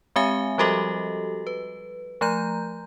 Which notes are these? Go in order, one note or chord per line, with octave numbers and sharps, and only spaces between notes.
G#3 C4 G4 E5 G#5
F3 G3 F#4 G4 A4 D#5
B4
F3 A3 A#5 G6